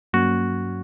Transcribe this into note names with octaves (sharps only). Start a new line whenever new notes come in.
G2 F#3 A#3 C#4 F#4